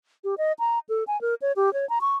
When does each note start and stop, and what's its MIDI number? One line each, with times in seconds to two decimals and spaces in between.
0.24 0.35 67
0.38 0.52 75
0.59 0.79 82
0.89 1.04 69
1.07 1.20 80
1.21 1.35 70
1.42 1.52 73
1.56 1.73 67
1.73 1.88 73
1.90 1.99 82
2.01 2.17 85